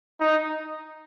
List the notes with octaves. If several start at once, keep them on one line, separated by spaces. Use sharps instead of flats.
D#4